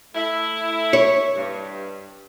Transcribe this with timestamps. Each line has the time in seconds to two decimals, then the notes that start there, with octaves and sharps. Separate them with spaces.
0.14 A3 E4
0.93 C#5
1.35 G2